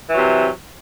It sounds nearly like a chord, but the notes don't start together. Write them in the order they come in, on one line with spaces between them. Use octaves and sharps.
E3 F#3 C3